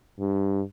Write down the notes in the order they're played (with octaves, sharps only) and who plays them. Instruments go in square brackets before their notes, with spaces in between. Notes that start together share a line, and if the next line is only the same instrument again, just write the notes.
[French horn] G2